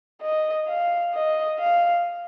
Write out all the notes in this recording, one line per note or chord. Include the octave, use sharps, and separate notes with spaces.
D#5
F5
D#5
F5